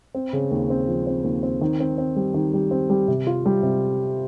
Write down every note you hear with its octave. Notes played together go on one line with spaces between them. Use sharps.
C4
C#3
D#2
C4
F3
C4
D#2
C4
D#3
C4
C4
G3
D#3
G3
C4
G3
C3
F4
G3
C3